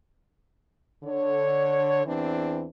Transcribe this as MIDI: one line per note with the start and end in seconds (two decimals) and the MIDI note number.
1.04 2.02 50
1.04 2.02 73
2.06 2.66 40
2.06 2.66 52
2.06 2.66 60
2.06 2.66 62